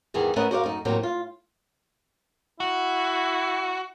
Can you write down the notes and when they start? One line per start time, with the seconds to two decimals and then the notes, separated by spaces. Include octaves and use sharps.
0.14 E2 G2 D#3 E3 B3 G#4
0.36 A3 B3 C#4 A#4 D#5 F#5
0.51 F#4 A#4 C5 D5 E5 F5
0.63 F#2 A3 D#4
0.85 A2 C3 F#3 A#3 C4 D4
1.03 F4
2.60 E4 F#4